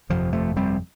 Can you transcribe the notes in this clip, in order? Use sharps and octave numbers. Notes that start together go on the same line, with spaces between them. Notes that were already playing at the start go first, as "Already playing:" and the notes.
G1 F2 C3 F3
F3 A3
G3 C4